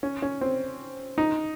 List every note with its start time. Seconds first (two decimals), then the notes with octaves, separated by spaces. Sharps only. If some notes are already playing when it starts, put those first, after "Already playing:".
0.03 C#4
0.22 C#4
0.41 C4
1.18 D#4